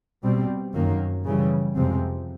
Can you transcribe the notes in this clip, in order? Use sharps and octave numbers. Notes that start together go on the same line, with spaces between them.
B2 G3 C4
F#2 D#3 F#3 A#3
C#3 E3 G3
F2 C3 F3 G#3 C4